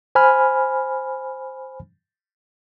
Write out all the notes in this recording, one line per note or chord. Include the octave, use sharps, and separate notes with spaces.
C5 G#5 B5 F6